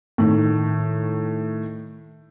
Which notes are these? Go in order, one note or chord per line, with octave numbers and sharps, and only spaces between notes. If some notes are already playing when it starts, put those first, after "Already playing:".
A2 D#3